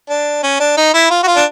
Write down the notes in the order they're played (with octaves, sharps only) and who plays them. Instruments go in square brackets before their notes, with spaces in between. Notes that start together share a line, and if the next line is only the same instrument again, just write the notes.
[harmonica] D4
C#4
D4
D#4
E4
F4
F#4
F4
D4